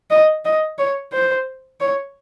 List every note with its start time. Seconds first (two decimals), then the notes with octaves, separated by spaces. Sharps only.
0.10 D#5
0.45 D#5
0.78 C#5
1.13 C5
1.80 C#5